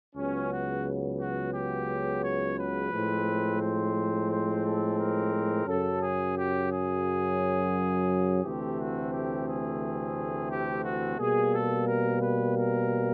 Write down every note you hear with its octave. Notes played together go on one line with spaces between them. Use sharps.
C#2 C#3 F#3 B3 C#4
F#4
F#4
G4
C#5
B4
A2 F3 G#3 C4
C5
C5
A4
A#4
F#2 C#3 F#3 A4
G#4
G4
G#4
D2 C3 E3 A3 C4 G4
F#4
G4
G#4
G4
F#4
B2 G3 A#3 G#4
A4
A#4
B4
A#4